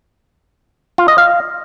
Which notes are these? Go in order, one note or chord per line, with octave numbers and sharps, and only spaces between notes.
F4
D#5
F5